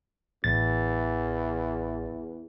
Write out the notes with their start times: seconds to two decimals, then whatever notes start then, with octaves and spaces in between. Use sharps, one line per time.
0.44 A1 E2 A6